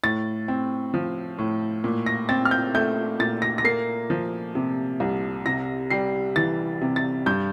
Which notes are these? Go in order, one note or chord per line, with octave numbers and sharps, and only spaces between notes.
A2 A6
C4
F3
A2
A#2
A#6
C4 A6
F6
G6
A3 G6
A#2 A6
A#6
A#6
A#3 C7
F3
C3
C2
C3 A#6
G3 C7
E3 A6
C3
A6
G2 G6